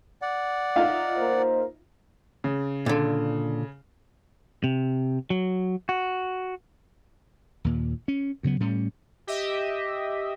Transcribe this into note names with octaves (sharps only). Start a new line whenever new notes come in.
D5 F#5
D#4 F4 E5 F5
A#3 A#4 C5
C#3
A#2 D3
C3
F#3
F#4
D#2 A#2
C#4
D2 C#3 F#3 B3
A2 G3 C#4
G4 D#5 E5